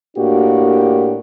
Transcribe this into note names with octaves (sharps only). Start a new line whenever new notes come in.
A2 A#3 D4 F#4 G4